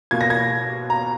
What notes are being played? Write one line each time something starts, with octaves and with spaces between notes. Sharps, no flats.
B2 A#3 F4 G#6
A#6
G#6
A#5